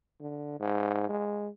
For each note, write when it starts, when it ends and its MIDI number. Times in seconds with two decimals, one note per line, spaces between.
0.20 0.59 50
0.59 1.07 44
1.09 1.48 56